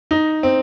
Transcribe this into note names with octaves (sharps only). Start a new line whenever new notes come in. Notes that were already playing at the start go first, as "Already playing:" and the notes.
D#4
C4